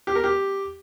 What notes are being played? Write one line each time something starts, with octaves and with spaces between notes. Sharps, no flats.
G4
A#4
G4